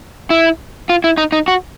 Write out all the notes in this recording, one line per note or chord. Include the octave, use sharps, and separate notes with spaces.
E4
F4
E4
D#4
D#4
F#4